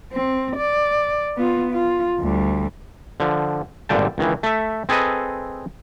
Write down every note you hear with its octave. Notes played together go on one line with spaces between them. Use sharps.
C4
D5
B3 F4
F4
D2 G3
D3 F3
G#1 G2 A#2 D3 G5 A5
C#2 D#3 E3
A3 E5
C4 G#4 A4 B4 D#5